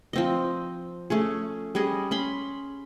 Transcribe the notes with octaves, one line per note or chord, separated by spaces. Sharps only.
F3 C4 D#5
A3 C#4 G#4
G3 C#4 G#4 D#5
C#4 B5 C6